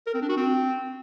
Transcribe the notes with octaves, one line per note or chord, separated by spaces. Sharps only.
A#4
C4
D4
F#4
C4